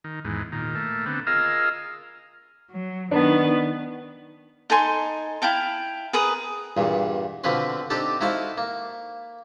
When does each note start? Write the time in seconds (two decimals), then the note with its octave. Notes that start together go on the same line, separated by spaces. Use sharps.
0.04 D#3
0.24 E2 G#2
0.52 A#2 D#3
0.75 A3 A#3
1.06 D3 B3 C4
1.27 F4 G#4 A#4 D#5 F5 E6
2.71 F#3
3.11 D#3 B3 D4
4.70 D#4 A4 G#5 C6
5.42 E4 F5 G5 A5
6.13 G#4 A#4 B4 D#6
6.77 E2 G2 A#2
7.44 B2 D3 F3 C4 B4 C6
7.90 C4 D4 D#4 G4 A4
8.21 D#4 E4 F#4 A4 C5 F5
8.58 A#3